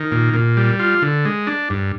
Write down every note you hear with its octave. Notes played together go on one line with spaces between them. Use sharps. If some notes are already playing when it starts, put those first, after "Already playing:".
Already playing: D#3
A#2
A#2
G3
F4
D3
G#3
D4
G2